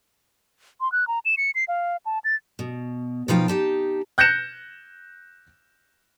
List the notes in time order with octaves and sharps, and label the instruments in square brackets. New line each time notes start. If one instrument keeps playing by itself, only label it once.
[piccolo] C6
F#6
A#5
E7
C#7
C7
F5
A5
A6
[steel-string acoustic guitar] B2
B2 F3 D#4 F4 F5 G5
D#4 G4 A5
[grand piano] F#6 G6 A#6 C#7 E7